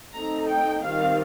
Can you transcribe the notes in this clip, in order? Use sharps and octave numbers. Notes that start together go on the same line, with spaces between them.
A3 C4 D#4 A#5
G5
D#3 G3 C4 F4 F5